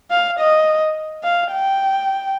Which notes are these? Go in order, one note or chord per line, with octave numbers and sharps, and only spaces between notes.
F5
D#5
F5
G5